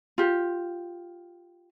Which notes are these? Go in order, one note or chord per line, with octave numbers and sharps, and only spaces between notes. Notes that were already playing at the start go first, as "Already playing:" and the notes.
F4 G4